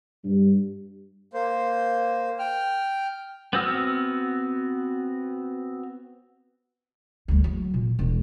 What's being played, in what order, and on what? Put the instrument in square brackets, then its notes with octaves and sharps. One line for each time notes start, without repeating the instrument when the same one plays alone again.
[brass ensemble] G2
[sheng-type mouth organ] A#3 C5
G5 F6
[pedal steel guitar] B3 C4 F#4 E6 F6
[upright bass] D2 G3
F#3
A#2
E1